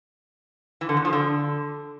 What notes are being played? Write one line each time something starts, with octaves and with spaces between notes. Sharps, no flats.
E3
D3
E2
F3
D3